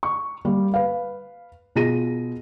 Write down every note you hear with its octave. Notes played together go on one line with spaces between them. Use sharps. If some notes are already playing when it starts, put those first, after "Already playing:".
C#6
G3 A#3
B4 F5
B2 F4 G#4 A#6 D#7